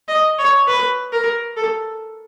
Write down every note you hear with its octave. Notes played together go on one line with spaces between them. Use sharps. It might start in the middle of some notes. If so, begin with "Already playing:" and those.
D#5
C#5
B4
A#4
A4